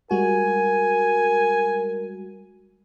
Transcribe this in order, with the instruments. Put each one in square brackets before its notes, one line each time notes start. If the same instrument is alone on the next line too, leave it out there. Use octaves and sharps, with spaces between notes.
[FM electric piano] G3 G#3 F#4 [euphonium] A#4 [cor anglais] G#5